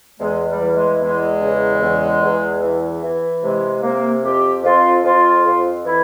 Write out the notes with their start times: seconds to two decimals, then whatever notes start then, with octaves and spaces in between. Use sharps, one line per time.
0.19 E2 G#3
0.46 G3
0.60 E3
0.73 G#3
1.00 E2 G#3
1.41 C#3
1.81 E2
2.21 E2
2.62 E3
3.02 E3
3.43 C3 G#3
3.82 C3 A#3
4.23 F2 G4
4.63 F2 F4
5.03 F2 F4
5.45 F2
5.85 E3 E4